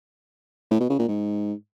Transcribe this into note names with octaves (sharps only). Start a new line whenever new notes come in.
A2
B2
C#3
A#2
G#2